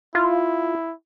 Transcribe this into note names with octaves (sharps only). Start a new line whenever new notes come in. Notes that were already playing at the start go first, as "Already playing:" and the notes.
E4 F4